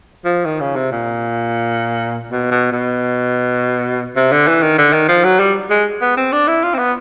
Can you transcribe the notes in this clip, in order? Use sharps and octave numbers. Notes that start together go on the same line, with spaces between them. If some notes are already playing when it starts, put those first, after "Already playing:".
F3
D#3
C#3
C3
A#2
B2
B2
B2
C3
D3
E3
D#3
D3
D#3
F3
F#3
G3
G#3
B3
C4
D4
E4
F4
C4
B3